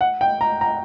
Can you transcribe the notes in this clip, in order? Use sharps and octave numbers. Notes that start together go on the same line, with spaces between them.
F#5
G5
A#5
A#5